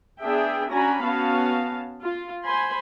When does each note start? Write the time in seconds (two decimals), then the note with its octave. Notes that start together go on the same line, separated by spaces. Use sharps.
0.21 B3 D4 G#4 E5 G5
0.70 C#4 D4 F#4 G#5 A#5 B5
1.03 B3 C#4 F#4 F5 A5
2.02 F4
2.44 C5 G#5 B5 C6